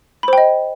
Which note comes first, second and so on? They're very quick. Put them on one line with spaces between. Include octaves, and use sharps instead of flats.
B5 C5 G5 D#5